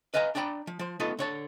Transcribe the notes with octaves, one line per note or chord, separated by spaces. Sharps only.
B4 D#5 F5 G#5 A#5
D4 D5 G5 A#5 B5
F3
F3 C5
A3 B3 D#4 F4 A4 B4
D3 C#5 A5